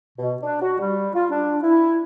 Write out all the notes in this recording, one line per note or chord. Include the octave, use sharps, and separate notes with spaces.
B2
D4
F#4
G3
F4
D4
E4